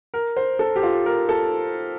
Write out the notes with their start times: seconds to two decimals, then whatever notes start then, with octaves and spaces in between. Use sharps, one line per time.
0.14 A#4
0.37 C5
0.59 A4
0.76 G4
0.83 F4
1.06 A#4
1.29 A4